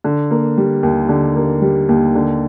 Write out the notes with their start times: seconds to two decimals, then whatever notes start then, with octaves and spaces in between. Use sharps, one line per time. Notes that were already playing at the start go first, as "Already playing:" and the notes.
0.04 D3
0.31 A#3
0.58 G3
0.83 D#2
1.09 D3
1.36 A#3
1.62 G3
1.89 D#2
2.15 D3